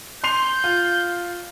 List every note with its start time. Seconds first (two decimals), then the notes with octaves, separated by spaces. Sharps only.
0.24 C6 G6 C7 F7
0.64 F4